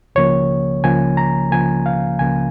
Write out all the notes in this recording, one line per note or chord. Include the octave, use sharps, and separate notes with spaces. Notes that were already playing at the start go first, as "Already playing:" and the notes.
C#2 C#3 F3 A#3 C#5
C#2 C#3 F3 A#3 G#5
A#5
C#2 C#3 F3 A#3 G#5
F5
C#2 C#3 F3 A#3 G#5